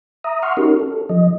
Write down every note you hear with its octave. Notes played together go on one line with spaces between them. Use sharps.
E5 A#5 D#6
F#5 C6 C#6 F6
C#4 D#4 F#4 G4 A#4
A4
F3 D#5